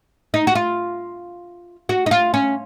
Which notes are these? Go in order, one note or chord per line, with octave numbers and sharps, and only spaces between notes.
D#4
F#4
F4
F#4
D#4
F4
C#4